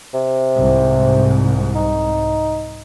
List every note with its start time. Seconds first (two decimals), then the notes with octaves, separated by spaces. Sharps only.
0.14 C3
0.56 C2 G#2
1.76 D#4